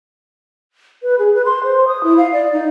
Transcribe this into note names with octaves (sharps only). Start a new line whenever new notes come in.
B4
G#4
B4
C6
C5
D#6
E4
F5
D5
D#4